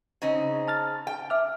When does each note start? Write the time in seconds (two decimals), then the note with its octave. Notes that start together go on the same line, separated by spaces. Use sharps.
0.22 C#3 C4 D#4
0.68 A5 F6 A6
1.07 G5
1.30 E5 D6 F6